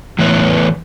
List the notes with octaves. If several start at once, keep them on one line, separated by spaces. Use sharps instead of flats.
A2 E3 B3 B4 C#5